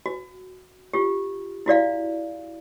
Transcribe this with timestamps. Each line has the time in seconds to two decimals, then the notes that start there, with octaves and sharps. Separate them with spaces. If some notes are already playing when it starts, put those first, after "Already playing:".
0.06 F#4
0.93 F4 G4
1.66 E4 F#4 D5 F5